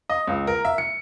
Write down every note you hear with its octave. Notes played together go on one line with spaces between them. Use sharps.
D#5
C#2
A#4
E5
C#7